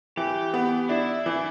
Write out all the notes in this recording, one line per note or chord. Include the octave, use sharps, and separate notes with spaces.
E3 G4
B3
D4 E4
E3